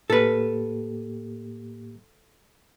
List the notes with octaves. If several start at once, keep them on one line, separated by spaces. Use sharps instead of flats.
A2 A#3 G4 A4 B4